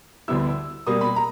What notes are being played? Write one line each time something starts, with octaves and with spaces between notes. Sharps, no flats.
D2 D3 G3 B3 E4 E6
B2 G3 A#3 D#6
B5
A#5